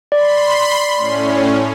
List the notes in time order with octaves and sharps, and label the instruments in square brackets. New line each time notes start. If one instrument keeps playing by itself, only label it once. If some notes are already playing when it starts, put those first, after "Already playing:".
[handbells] D5 [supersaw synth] B5 C6
[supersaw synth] A2 C#4